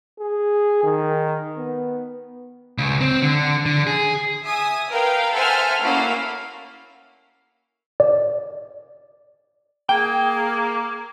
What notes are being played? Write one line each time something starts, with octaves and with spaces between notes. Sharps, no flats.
G#4
D#3
B3
C#2
C4
D3
D3
G#4
E5 G#5 D#6
A#4 B4 F5 G5
A4 C5 E5 F#5 G#5 F6
A3 A#3 C#4 E4 F#4 F5
D5
A#3 G#4 G5 G#6